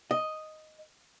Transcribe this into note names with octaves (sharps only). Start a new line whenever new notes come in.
D#5